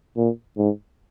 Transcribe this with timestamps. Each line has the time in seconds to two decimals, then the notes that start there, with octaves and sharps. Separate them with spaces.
0.17 A#2
0.57 G#2